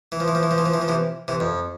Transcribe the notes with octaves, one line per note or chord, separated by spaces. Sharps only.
E3
F3
E3
F3
E3
F3
E3
F3
E3
F3
C3 E3
C3 E3
F2